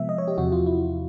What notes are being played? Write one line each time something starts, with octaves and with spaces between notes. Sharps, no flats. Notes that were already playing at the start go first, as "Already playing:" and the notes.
Already playing: C3 F3 G#3 B3 E5
D#5
C#5
G4
E2 C3 F3 F#4
F4
E4